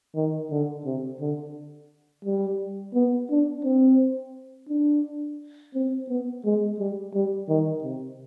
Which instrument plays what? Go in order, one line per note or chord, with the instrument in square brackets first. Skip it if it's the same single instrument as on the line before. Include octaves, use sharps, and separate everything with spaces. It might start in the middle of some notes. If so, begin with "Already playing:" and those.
[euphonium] D#3
D3
C3
D3
G3
B3
D4
C4
D4
C4
B3
G#3
G3
G3
D#3
C3